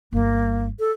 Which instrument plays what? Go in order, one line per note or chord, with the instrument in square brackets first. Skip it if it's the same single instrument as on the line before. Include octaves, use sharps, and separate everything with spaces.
[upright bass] G1 G3 [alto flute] A#3
[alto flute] A4